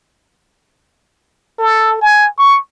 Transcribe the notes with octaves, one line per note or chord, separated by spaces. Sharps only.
A4
G#5
C#6